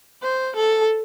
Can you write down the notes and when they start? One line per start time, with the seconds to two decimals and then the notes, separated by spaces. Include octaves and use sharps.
0.23 C5
0.56 A4